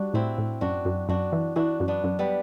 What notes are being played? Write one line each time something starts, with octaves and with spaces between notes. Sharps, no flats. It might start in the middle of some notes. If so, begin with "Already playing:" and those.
Already playing: G3 D4 F#4
A2 C4 E4
A2
F#2 D4 F#4
F#2
F#2 D4 F#4
E3
E3 D4 F#4
F#2
B3 D4
F#2
G3 B3